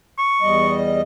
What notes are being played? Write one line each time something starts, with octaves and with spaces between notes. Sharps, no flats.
C#6
E2 G3 D#5